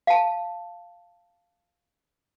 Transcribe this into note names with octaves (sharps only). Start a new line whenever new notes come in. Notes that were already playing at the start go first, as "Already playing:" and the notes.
F5 A5